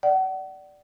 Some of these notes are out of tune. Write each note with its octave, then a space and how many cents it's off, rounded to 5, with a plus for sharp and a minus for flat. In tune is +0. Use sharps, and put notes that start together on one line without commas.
D5 +0 F#5 +35